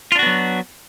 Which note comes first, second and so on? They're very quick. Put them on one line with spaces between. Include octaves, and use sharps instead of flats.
F4 D4 F#4 B3 F#3